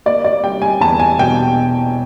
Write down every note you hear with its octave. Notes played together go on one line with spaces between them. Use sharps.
A#3 D5
D5
G3 G5
G#5
E2 A5
G#5
B2 G5